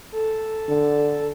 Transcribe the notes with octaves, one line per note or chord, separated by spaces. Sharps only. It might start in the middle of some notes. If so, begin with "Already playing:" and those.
A4
D3